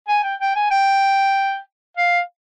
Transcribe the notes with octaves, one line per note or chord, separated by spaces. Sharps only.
G#5
G5
G5
G#5
G5
F5